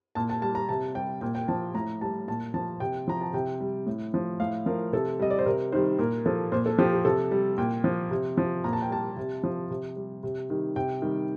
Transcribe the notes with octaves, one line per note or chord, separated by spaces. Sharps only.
A#2 A5
A5
G3 A5
A#5
C3 A5
G3 G5
A#2 G5
G5
F3 A5
A2 A#5
G3 A5
A#2 A5
F3 A5
C3 G5
F3 A#5
A5
C3 G5
G3
A2
F3
A2 F5
F3 A#4
C3 A4
G3 D#5
D5
C5
C3 A#4
D#3 G3 C5
A#2 A#4
F3 A4
A#2 C5
A4
F3 G4
G4
C3 A4
G3
A#2 G5
F3
C3
F3
A#2 A#5
A5
G5
G3 A5
C3
F3
C3
G3
C3
D#3 G3
C3 G5
D#3 G3